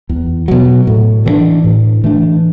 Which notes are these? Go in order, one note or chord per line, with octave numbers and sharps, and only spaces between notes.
E2
B2 F#3
A2
E3 A3 D4
A2
E3 A3 D4